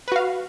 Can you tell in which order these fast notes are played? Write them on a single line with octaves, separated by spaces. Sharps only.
B4 F#4 F5